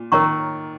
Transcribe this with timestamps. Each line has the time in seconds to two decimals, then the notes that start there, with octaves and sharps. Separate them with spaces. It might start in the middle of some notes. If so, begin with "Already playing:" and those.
Already playing: A#2
0.12 D#3 A#4 C#5 A#5 C#6